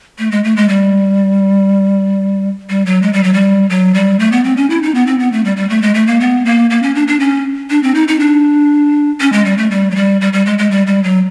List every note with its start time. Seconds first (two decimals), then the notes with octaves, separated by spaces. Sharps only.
0.19 A3
0.31 G#3
0.44 A3
0.56 G#3
0.69 G3
2.70 G3
2.86 F#3
3.02 G#3
3.13 G3
3.24 F#3
3.34 G3
3.70 F#3
3.94 G3
4.19 A3
4.32 B3
4.44 C4
4.57 C#4
4.70 E4
4.83 D#4
4.95 B3
5.07 C4
5.19 B3
5.32 A3
5.45 G3
5.57 G3
5.70 A3
5.82 G#3
5.94 A3
6.07 A#3
6.20 B3
6.45 A#3
6.70 A#3
6.83 C#4
6.95 D4
7.08 D4
7.20 C#4
7.70 D4
7.83 C4
7.95 D#4
8.08 D#4
8.20 D4
9.20 C#4
9.33 G#3
9.45 G3
9.58 A3
9.71 G3
9.91 F#3
9.96 G3
10.21 G3
10.33 G3
10.46 G#3
10.58 G#3
10.71 G3
10.87 G3
11.04 F#3